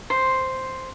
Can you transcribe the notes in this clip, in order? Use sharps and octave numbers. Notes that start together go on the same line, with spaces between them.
C5